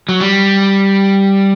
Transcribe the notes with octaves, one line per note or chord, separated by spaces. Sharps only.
F#3
G3